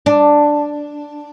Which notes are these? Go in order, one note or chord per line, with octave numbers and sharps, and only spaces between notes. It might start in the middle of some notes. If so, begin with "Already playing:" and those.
D4